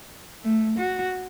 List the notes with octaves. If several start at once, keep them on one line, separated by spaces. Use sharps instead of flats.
A3
F#4